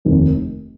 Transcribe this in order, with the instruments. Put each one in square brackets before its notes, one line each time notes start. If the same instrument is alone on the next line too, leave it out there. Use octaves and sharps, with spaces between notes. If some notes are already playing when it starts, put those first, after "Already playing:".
[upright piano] F1 D#2 D#3